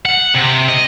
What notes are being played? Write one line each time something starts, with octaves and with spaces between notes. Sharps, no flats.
F#5
C3
D#5